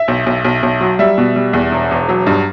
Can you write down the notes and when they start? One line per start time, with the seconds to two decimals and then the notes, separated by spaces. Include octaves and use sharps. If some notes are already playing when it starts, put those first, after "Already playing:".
Already playing: E5
0.08 B1
0.26 B1
0.44 B1
0.63 B1
0.81 F#3
0.99 G3 E5
1.18 B2
1.36 G3
1.53 E2
1.72 E1
1.91 E1
2.09 F#3
2.27 G2